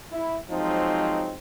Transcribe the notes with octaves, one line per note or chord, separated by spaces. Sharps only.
E4
F3 F#3 G#3 C4 D#4